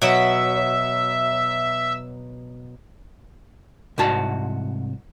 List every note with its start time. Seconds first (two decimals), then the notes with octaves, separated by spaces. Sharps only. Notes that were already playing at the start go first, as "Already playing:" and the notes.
0.02 B2 F#3 E5
3.98 C2 G#2 F#4 A5